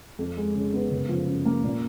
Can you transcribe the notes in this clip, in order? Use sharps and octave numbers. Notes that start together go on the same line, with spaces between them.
F2
G#3
C#3
B3
F#1
F3
F#2
A#3
A#2